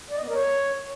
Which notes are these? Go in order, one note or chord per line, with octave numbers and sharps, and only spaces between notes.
D5
D#5
B3
A#4
C#5